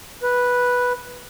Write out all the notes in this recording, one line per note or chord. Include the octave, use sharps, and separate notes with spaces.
B4